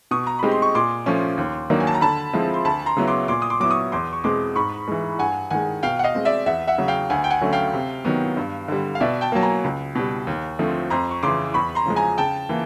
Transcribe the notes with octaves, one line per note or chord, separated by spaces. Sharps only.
B2 C#6 D#6
A#5
G#3 C4 D#4 G4 B5
C6
C#6
A#2 C6 D6
F3 A3 C#4
D#2
D#3 F#3 A#3 D4
G#5
A5
A#5
D3 A5 B5
F3 G#3 C4 E4
C6
D2 A5 B5
A#5 C6
C#3 F#3 B3 E4
C6 D6
A#2 C6 D6
D#6
C6 D6
F#3 B3 E4 D6
C#6 D#6
E2 C6 D6
C#6
B2 G#3 C4 C6 D6
G#2 B5 C#6
E3 G#3
G2 F#5 G#5
D#3 G#3 F#5 G#5
B2 F5 G5
F#5
D#5 F5
G#3 C4
D5 E5
E2 E5 F#5
E5 F#5
C#3 F#3
F5 G5
D2 F#5 G#5
G5
F#5 G#5
D3 F#3 A3 C#4
F5 G5
C3
D#3 F#3 B3
G2
D3 G3
F5
B2 D5 E5
G5 A5
F#3 A#3 A5
G#5 A#5
C#2
B2 G3
D#2
D3 F3 A3 C4
F2 A#5 C6
C#6
C#3 E3 C6 D6
E2 B5 C#6
A#5 C6
C#3 F3 G#3
G#5 A#5
C#3 G5 A5
E3 A#3